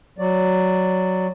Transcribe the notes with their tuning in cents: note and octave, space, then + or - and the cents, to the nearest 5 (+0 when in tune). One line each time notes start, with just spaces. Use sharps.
F#3 +0 D5 +0